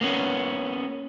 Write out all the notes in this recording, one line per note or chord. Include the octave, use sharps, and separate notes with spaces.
A#3 B3 C#4